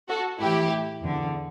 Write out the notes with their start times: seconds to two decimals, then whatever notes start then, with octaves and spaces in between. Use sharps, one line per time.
0.09 F#4 A4
0.40 A2 E3 E4 G4
1.03 E2 D3